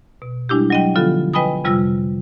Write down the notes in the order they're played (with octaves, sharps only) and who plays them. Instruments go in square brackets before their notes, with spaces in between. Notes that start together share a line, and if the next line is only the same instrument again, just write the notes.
[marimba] B2
G3 G#3 D4 E4 G4
F#3 D#5 G5
D3 F3 B3 F4 A4
B4 D#5 G5 G#5 B5 D#6
F2 C3 G3 F4 E6 A#6